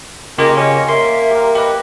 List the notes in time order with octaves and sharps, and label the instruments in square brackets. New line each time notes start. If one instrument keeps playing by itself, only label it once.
[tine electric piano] C#3 F4 G4 [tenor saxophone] A#3 [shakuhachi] D#5
[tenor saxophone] C#4 [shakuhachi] D#5
[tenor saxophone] A#3 [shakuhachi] E5 [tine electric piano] C6
[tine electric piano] G4 A#4
[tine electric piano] G4 B4 [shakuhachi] D#5